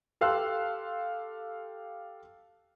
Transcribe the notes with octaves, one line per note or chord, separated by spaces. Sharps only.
G4 A4 F5 C6 E6 F#6